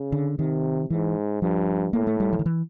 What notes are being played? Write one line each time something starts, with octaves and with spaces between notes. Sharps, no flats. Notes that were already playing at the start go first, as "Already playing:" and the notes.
Already playing: C#3
D3
C3 D#3
G#2 E3
G2 F3
A2 A#3
A3
G3
F3
D#3
E3